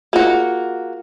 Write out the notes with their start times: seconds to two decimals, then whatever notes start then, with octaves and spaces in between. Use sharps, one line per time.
0.13 A#3 F4 F#4 G#4